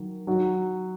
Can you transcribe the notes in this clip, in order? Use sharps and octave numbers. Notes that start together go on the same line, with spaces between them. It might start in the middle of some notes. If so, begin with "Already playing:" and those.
Already playing: D#3 F#3
F#3 D#4 F#4